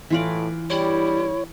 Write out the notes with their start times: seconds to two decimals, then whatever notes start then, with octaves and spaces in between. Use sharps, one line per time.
0.10 A2 E3 F4 D5
0.70 E2 G2 G3 E4 C#5